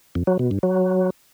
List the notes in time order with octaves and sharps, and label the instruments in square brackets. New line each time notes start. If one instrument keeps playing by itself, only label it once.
[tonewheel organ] F2
F#3
B2
G2
F#3